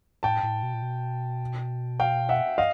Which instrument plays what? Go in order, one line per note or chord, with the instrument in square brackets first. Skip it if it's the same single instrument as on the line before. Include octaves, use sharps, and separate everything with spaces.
[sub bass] A2 [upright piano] G5 A5
[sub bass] A2
B2
A#2
B2
[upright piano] F5 G5
E5 F#5
D#5 F5